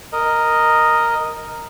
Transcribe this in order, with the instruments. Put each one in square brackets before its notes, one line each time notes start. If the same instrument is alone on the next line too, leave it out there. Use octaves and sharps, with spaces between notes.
[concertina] A#4 D#5